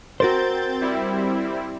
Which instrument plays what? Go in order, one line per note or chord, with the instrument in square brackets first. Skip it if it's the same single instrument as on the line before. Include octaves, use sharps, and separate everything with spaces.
[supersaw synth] C4 G6 A6 [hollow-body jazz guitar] F#4 A#4 C5
[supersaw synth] G3 C4 E4